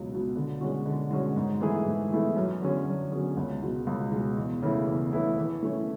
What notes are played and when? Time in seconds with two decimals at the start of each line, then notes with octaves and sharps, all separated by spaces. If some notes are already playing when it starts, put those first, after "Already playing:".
Already playing: C#2 B2 F#3
0.10 B2 F#3
0.36 D3
0.61 G#3 C#4 F#4
0.86 D3
1.11 G#3 C#4 F#4
1.37 G#2
1.61 E3 A3 E4 G#4
1.86 G#2
2.12 E3 A3 E4 G#4
2.36 F#2
2.62 D3 F#3 C#4 G#4
2.86 F#2
3.12 D3 F#3 C#4 G#4
3.37 C#2
3.62 B2 G#3
3.87 C#2
4.12 B2 G#3
4.37 E2
4.63 C#3 E3 A3 E4
4.87 E2
5.13 C#3 E3 A3 E4
5.37 E3
5.63 A3 C#4